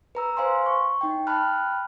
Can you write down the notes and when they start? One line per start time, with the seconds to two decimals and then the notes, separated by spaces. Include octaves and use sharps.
0.15 B4 A#5 E6
0.37 C5 F5 G#5 C6
0.66 C#6
1.01 D#4 G5
1.27 G5 A5 B5 F6 F#6